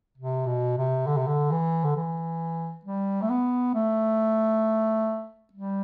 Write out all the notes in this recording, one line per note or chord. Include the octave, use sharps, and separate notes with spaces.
C3
B2
C3
D3
C3
D3
E3
D3
E3
G3
A3
B3
A3
G3